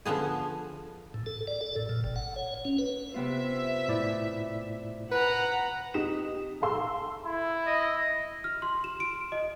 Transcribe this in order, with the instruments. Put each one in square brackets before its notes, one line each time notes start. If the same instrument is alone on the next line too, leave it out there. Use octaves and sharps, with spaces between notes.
[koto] D3 F3 B3 G#4
[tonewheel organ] A2
A4
D5
A4
A2
A#2
G1
F#5
C#5
C#4
B4
[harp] C3 B3 F4 [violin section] E5
[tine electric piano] A2 E4 D5
[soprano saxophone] B4 [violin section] F#5 A#5
[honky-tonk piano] C3 D#4 D#6 B6 E7
G#4 A4 F5 C6 E6
[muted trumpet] E4
[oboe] D#5
[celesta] F6
C6
E7
D7
D#5